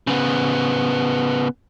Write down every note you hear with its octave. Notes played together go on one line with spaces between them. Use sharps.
C#3 B3